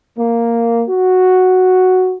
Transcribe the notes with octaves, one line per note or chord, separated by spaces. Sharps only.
A#3
F#4